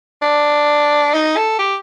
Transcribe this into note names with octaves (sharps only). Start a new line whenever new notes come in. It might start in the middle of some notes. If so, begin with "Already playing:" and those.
D4
D#4
A4
G4